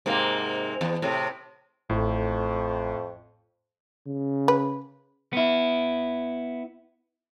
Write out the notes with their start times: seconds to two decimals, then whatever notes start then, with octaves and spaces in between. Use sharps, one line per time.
0.06 G#2 C3 A#3
0.81 E2
1.02 A2 C3
1.90 A1 F2 A2
4.07 C#3
4.48 B4
5.33 B3 E4